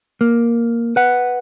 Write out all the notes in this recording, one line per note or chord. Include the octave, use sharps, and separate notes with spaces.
A#3
B4 F#5